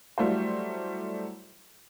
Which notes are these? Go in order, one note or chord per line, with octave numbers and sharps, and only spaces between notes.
F#3 G3 A3 E4 C5